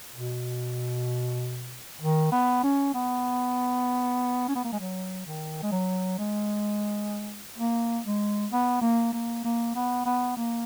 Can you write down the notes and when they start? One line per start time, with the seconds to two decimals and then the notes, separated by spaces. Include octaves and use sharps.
0.15 B2
2.01 D#3
2.32 B3
2.63 C#4
2.94 B3
4.48 C#4
4.55 B3
4.64 A#3
4.72 G#3
4.79 F#3
5.26 D#3
5.63 G#3
5.72 F#3
6.18 G#3
7.58 A#3
8.05 G#3
8.51 B3
8.82 A#3
9.13 A#3
9.45 A#3
9.75 B3
10.06 B3
10.37 A#3